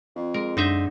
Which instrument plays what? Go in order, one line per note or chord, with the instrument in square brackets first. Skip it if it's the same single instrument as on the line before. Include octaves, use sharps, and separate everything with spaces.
[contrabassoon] F2
[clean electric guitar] G#3 [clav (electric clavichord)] A#4
[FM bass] F#2 [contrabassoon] D3 [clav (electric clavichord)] C4 D#4 E5